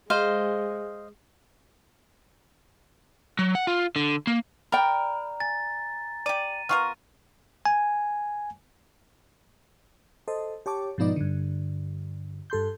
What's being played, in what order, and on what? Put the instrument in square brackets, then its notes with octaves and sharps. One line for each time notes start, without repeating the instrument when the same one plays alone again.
[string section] G#3 [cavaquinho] C5 D#5 F5
[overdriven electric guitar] F#3
F#5
F4
D3
A#3
[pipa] A#4 [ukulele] D5 G5 [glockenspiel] A#5 [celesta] B5
[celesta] G#5 [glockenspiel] A6
[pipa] G4 D5 [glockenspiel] D#7
[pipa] B3 F4 A#4 [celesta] C#6 F6
[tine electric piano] G#5
[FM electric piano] A4 C5 D#5
G4 C#5 A5 D6
G#2 B2 F3 B3 D#4 D5
G2 D3
G2 A4 C6 G6